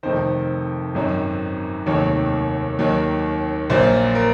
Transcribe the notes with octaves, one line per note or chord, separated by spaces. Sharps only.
F1 F2 D#3 C5
G#1 F#2 D#3 F#3
F1 D#2 D#3 F#3 C#5
D#2 D#3 F#3
A#1 A#2 F#3 C5
A#4